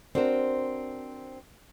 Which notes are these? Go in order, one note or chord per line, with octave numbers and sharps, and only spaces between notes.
C4 D4 F#4 A#4 C5